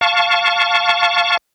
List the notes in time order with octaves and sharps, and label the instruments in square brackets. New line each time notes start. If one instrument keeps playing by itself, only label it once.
[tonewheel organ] F5 A5 C#6